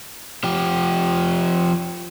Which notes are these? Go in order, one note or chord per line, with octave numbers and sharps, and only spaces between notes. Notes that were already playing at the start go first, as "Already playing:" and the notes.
F3 G4